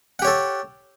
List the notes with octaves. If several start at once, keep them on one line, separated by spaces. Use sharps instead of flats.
G4 A4 C#5 F#5